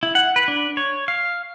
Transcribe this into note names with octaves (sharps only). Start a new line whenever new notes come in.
E4
F#5
B4
D4
C#5
F5